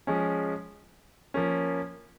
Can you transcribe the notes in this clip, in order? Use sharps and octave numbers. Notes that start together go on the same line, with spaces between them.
F3 G#3 C#4
F3 A#3 C#4